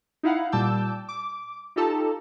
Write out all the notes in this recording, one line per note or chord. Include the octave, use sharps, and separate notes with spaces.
D#4 E4 F5 F#5
A#2 G3 A5 D6 E6 G6
D6
D#4 F4 G4 A4 A5 A#5